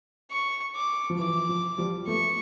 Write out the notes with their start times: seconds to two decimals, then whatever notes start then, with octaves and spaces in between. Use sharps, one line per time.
0.31 C#6
0.75 D6
1.10 F3
1.19 E3 D6
1.49 F3
1.78 F3 G3
2.07 A3 B3 C#6